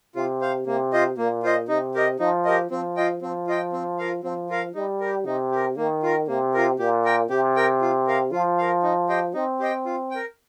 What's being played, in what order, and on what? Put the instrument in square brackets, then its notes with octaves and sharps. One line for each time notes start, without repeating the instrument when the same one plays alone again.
[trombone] C3 [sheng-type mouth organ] F4
[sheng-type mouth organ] C5 F5
[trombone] C3 [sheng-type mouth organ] A#3
[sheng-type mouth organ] F4 C5 D#5
[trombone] A#2 [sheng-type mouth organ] A#3
[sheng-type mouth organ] F4 C5 D#5
[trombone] C3 [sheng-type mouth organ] D#4
[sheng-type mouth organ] G4 A#4 D#5
[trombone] F3 [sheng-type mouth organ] D#4
[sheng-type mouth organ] G4 A#4 D#5
[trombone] F3 [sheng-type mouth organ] C4
[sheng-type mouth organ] F4 D#5 G5
[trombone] F3 [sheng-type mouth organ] C4
[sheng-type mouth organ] F4 D#5 G5
C4
F4 A#4 F5
[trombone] F3 [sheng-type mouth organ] C4
[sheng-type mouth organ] F4 A#4 F5
[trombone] G3 [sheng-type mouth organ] D#4
[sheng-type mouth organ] G4 A#4
[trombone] C3 [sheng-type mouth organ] D#4
[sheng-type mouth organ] G4 A#4
[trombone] D#3 [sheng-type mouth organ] A#3
[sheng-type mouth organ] F4 A#4
[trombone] C3 [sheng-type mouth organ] A#3
[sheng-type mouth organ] F4 A#4
[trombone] A#2 [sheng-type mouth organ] G4
[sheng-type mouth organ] A#4 G5
[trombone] C3 [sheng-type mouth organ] G4
[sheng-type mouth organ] A#4 G5
F4
A#4 F5
[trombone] F3 [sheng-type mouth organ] F4
[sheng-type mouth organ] A#4 F5
D#4
G4 C5 D#5 G5
[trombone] C4 [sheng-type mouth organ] D#4
[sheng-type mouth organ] G4 C5 D#5 G5
F4
A#4 G5